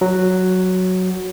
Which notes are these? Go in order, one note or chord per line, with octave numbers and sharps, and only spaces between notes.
F#3